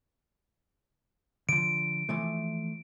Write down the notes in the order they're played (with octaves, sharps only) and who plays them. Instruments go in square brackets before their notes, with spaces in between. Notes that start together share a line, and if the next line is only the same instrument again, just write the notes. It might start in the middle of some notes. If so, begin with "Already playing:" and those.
[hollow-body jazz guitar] D3 F3 [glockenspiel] D7
[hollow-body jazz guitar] E3 F3 A3